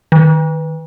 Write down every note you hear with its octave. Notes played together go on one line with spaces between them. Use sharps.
D#3